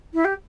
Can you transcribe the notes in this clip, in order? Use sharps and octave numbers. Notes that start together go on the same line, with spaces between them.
E4
G4